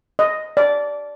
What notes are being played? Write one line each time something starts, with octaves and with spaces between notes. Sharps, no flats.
D#5
D5